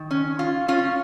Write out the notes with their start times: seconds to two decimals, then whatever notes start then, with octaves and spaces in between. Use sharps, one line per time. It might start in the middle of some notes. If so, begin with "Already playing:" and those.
Already playing: D#3
0.11 C#4
0.39 F4
0.68 C#4 F4